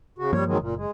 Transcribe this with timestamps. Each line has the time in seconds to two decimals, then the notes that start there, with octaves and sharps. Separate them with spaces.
0.18 C#3 F#4
0.33 G2 F3 G3 A#3 C#5
0.46 D#3 F#3 G#3
0.60 F#1 A#2
0.76 G#3